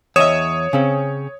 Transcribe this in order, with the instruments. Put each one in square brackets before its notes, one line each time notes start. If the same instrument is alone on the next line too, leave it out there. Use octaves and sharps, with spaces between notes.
[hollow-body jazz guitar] E2 D#5 E5 [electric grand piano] C#5 D#6 E7
[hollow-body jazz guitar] C#3 C4 C#4